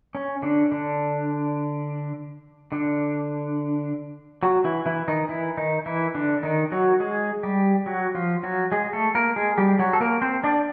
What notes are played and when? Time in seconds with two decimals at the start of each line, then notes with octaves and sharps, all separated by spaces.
0.15 C#4
0.42 D3 D4
0.72 D3 D4
2.72 D3 D4
4.43 F#3 F#4
4.64 E3 E4
4.86 E3 E4
5.08 D#3 D#4
5.29 E3 E4
5.57 D#3 D#4
5.86 E3 E4
6.15 D3 D4
6.43 D#3 D#4
6.72 F#3 F#4
7.00 G#3 G#4
7.43 G3 G4
7.86 F#3 F#4
8.15 F3 F4
8.43 F#3 F#4
8.72 G#3 G#4
8.93 A3 A4
9.15 A#3 A#4
9.36 G#3 G#4
9.58 G3 G4
9.79 F#3 F#4
9.93 A4
10.00 A#3 A#4
10.22 C4 C5
10.44 D4 D5